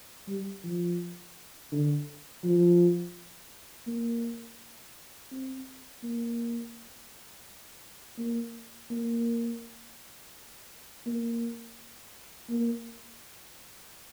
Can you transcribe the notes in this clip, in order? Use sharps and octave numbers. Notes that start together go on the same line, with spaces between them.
G3
F3
D3
F3
A#3
C4
A#3
A#3
A#3
A#3
A#3